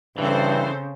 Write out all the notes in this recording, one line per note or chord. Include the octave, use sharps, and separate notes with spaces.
G2 C#3 E3 C4 A4 C5